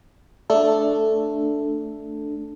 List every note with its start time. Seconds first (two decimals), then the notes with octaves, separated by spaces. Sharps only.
0.50 A3 D4 A4